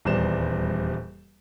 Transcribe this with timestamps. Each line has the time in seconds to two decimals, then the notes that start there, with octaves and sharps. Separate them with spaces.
0.05 D#1 E2 G3 C5 E7